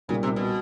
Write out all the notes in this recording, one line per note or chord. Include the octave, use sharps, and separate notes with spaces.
B1 A#2 C#3 G3
C3
B2